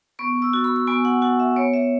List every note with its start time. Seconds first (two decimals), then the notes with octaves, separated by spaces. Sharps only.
0.19 B3 C#6
0.42 E6
0.53 F#4
0.64 B5
0.76 B5
0.87 B3 G#5
1.05 F#5
1.22 F#4 F#5
1.40 E5
1.56 B3 C#5
1.73 E5